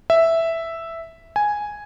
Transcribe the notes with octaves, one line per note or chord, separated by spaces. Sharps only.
E5
G#5